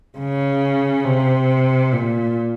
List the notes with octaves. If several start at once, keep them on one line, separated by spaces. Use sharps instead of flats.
C#3
C3
A#2